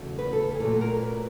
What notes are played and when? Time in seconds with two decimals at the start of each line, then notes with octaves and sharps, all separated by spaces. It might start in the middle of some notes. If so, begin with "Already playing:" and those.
Already playing: E2 C#3 F#3 A3
0.19 B4
0.33 A4
0.55 G#4
0.60 A#2 F#3 A3 A4
0.81 A#4
1.02 B4